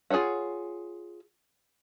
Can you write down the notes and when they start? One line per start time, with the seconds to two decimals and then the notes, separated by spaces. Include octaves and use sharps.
0.10 F4 G#4 A4 C#5 F#5